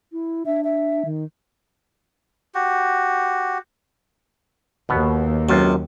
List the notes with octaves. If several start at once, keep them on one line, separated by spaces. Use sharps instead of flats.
E4
D4 E5
E5
D#3
F#4 G4
D#2 B2 B3
C#2 F#2 C3 F4